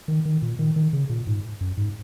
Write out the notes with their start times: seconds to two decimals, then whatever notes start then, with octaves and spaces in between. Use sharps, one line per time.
0.08 D#3
0.25 D#3
0.42 A#2
0.59 D#3
0.76 D#3
0.93 C#3
1.10 A#2
1.27 G#2
1.61 F#2
1.77 G#2